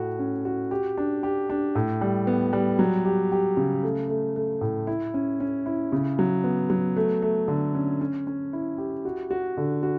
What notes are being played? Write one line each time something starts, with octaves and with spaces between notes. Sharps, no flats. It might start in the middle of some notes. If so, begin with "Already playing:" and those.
Already playing: A2 A3 F#4
C#4
F#4
G4
D4
G4
D4
A2
G3
B3
G3
F#3
G4
G4
C#3
A3
A3
A3
A2
E4
C#4
C#4
E4
C#3
F#3
B3
F#3
A3
A3
D3
C#4
C#4
C#4
E4
G4
F#4
F#4
D3
F#4